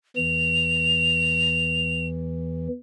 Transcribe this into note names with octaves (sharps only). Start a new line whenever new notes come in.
E2 E3 F7